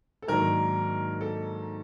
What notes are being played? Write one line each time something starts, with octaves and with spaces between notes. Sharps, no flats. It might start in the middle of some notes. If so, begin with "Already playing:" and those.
A4
G#2 D#3 F#3 A#3 D4 A#4
A4